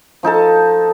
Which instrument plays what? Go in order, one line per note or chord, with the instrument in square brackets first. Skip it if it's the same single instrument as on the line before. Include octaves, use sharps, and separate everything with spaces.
[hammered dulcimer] F3 D#4 A4 A5